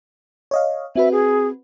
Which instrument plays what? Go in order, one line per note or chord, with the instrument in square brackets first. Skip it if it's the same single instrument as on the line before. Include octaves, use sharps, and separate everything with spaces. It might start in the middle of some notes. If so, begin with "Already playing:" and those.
[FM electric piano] C#5 D#5 F5
[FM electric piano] C4 F#4 B4 [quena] E5
[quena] G#4